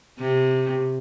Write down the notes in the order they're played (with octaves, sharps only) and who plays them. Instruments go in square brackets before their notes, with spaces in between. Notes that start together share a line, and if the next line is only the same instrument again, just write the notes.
[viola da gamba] C3